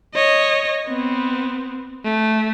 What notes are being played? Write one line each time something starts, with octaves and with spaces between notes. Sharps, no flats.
C#5 D#5
B3 C4
A3